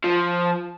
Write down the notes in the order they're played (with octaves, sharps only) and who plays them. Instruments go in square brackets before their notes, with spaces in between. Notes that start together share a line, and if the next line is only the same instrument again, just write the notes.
[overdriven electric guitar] F3